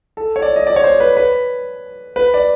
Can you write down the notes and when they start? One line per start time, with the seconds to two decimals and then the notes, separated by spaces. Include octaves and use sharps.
0.17 A4
0.36 C#5
0.42 D5
0.56 D#5
0.67 D5
0.76 C#5
0.84 C5
1.00 B4
1.17 B4
2.16 B4
2.34 D5